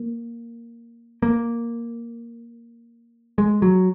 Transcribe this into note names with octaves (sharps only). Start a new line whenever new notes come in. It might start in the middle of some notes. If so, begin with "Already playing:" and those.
Already playing: A#3
A#3
G#3
F#3